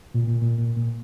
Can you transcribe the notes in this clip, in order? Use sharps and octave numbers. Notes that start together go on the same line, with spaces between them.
A#2
A#2
A#2
A#2
A#2